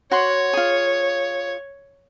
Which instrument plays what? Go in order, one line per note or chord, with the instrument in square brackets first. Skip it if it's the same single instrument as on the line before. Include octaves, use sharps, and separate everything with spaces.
[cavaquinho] F#4 F#5 C6 [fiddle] C#5
[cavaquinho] F4 G#4